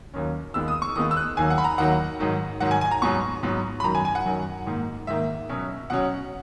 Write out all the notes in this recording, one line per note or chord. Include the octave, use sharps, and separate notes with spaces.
D#2 D#3 F#3 C#4
D#2 D#3 G#3 B3 E6
D#6
C#6
D#2 D#3 G#3 B3 D#6
E6
F#6
D#2 D#3 F#3 G#5
F#5
B5
A#5
D#2 D#3 F#3 F#5
G#2 D#3 F#3
G#2 D#3 F#3 F#5
G#5
G#5
A#5
G#2 F#3 B3 C#6
G#2 F#3 B3
B5
F#2 D#3 F#3 A#5
G#5
G#5
F#5
F#2 D#3 F#3
G#2 D#3 A#3
G#2 D#3 A#3 E5
B2 F#3 C#4
B2 F#3 C#4 F#5